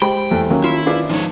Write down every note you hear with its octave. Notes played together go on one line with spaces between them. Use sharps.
G#3 G4 C5 G5 B5
E2 A3
D#3 F#3 A#3 C#4
E4 F4
D4 F4 G#4 B4
G#2 F3 C#5